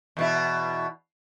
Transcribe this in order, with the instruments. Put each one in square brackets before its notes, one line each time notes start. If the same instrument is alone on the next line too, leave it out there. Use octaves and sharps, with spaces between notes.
[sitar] E2 B2 E4